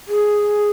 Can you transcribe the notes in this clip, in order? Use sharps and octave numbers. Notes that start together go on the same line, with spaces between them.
G#4